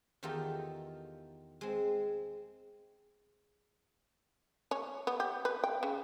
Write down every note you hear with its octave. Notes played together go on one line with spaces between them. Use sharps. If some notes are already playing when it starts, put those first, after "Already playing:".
E2 D#3 F4 G4 A4 A#5
G#3 C4
C#4
B3
G4
B4
G5
C#3